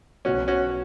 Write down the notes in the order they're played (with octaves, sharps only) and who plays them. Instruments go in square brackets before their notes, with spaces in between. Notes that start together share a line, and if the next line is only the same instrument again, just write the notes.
[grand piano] B1 B2 F#3 [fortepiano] C#4 F#4
[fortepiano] C#4 F#4